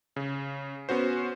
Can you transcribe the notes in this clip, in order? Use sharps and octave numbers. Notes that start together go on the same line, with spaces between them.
C#3
B3 C#4 F#4 C5